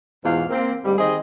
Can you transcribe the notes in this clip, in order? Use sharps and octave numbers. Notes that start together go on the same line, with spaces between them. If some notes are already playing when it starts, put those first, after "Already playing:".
E2 G#2 B2 F4 F5
A#3 C4
D2 G#2 G3
D#3 C4 G#4 D#5